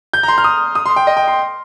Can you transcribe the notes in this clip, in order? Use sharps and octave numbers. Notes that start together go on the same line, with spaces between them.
G6
A#5
C6
F6
D#6
D#6
C6
G5
D#5
G5
C6